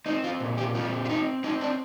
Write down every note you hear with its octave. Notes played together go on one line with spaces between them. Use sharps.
C4 D#4
F4
A#2
G4
C4 F4
F4
C4 D#4
C4 D#4
D4